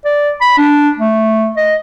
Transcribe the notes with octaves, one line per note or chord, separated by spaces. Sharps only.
D5
B5
D4
A3
D#5